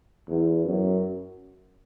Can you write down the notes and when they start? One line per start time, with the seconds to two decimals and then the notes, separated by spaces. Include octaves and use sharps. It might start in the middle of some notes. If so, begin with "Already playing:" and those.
0.28 E2
0.64 F#2